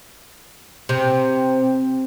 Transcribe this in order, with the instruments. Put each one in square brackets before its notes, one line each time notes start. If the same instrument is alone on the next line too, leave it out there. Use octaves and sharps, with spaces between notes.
[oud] C3